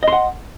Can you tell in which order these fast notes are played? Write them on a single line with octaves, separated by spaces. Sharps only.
D#5 C6 F#5